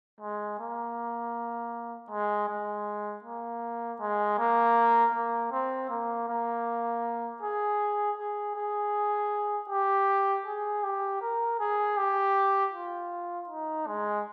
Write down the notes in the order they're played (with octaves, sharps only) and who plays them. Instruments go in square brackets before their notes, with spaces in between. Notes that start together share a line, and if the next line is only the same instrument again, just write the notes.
[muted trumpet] G#3
A#3
G#3
G#3
A#3
G#3
A#3
A#3
C4
A#3
A#3
G#4
G#4
G#4
G4
G#4
G4
A#4
G#4
G4
F4
D#4
G#3